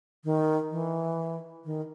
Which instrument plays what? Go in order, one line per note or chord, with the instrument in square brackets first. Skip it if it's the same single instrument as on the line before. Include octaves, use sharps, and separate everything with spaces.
[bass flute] D#3
E3
D#3